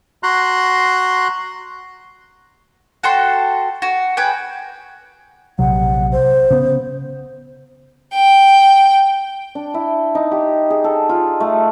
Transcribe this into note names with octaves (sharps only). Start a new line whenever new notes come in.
F#4 A#5 C6 F#6
F#4 A4 G5 C6
F#4
G#4 B4 G5
A#1 C3 F#3 F#5
C5
C#3 B3
G5
D4
E4
D#4
G4
G#4
A4
F4
A3